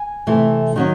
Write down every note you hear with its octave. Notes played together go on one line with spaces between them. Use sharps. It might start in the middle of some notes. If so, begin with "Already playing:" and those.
Already playing: G#5
C3 E3 A3
D#3 F#3 C#4